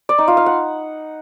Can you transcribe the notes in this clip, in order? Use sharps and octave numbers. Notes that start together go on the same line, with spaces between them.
D5
D#4
F4
F5
F#5